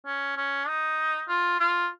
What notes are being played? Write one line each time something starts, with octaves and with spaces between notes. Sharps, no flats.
C#4
C#4
D#4
F4
F4